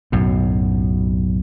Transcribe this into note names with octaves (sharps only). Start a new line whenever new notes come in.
B1 F#2 A2